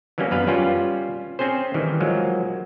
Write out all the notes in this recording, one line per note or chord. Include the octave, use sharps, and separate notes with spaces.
E3 F#3 G3 A#3 C#4
F#2 B3 B4 F5
G3 C#4 F4 B4
C4 C#4 G#4 C5
D#3 E3 G3
F3 F#3 G#3 A#3